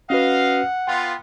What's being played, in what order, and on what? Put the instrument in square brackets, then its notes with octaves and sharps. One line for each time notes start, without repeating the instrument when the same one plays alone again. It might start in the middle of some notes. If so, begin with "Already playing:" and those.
[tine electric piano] C#4 F#4 B4 [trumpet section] D#5 F5 [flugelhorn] F#5
[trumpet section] B3 F4 [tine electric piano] G5